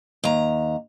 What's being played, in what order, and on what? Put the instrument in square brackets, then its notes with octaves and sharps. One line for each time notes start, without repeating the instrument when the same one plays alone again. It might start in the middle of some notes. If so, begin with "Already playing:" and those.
[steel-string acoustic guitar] D#2 A#5